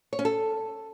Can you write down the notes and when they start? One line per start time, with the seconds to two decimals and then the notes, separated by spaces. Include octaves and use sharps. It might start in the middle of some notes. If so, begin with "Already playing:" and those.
0.13 C#5
0.19 C#4
0.25 A4